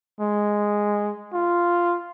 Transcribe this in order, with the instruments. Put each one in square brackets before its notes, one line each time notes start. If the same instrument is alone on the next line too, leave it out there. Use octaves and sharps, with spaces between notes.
[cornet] G#3
F4